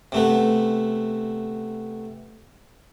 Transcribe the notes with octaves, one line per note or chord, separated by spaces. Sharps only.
C3 A3 B3